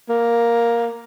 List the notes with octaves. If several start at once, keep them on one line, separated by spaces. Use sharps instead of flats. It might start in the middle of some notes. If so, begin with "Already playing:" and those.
A#3